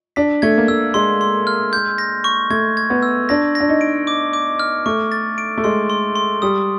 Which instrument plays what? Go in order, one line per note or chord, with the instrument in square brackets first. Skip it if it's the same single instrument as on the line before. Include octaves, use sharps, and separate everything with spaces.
[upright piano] D4 [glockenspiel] B6
[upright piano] A3 [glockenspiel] G#6
[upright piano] A#3
[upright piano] A3 [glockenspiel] E6
[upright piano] G#3 [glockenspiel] C6
[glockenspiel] C6
F6
G6
A#6
C#6
[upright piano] A3 [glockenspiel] G#6
[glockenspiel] G#6
[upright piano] B3
[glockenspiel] E6
[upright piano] D4 [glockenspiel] A#6
[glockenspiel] A#6
[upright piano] D4
D#4
[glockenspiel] D7
D6
D6
F6
[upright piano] A3 [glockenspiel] C#6
[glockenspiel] A6
D7
[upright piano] A3
[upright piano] G#3 [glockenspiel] C6
[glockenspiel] C6
C6
[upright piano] G3 [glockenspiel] D#6